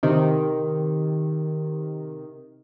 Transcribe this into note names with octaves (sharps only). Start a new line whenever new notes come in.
C3 D#3